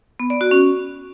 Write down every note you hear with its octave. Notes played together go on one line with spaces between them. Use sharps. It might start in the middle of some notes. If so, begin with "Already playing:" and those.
B3
D5
F#4
C#4